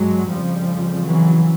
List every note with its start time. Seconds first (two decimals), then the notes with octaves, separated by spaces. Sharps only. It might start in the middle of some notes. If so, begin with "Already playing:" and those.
Already playing: G2 F#3 G#3
0.29 F2 C#3 F3 G3
1.05 E3 F#3